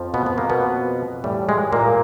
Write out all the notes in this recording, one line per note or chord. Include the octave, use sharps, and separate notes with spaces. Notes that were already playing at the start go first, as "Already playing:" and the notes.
Already playing: F2 F3
B2 B3
B3
A#3
B2 B3
A2 E3 G3
G#3
A#2 A#3